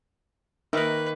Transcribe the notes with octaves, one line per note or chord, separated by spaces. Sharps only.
D#3 A#3 D#4 A#4 B4 E5